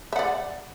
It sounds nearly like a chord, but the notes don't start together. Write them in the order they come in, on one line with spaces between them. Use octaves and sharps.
E5 F#5 D5